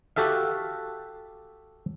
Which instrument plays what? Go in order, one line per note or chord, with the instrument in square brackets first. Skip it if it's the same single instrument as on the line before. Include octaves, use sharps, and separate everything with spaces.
[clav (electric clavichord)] F#4 G4 A4 E5 F5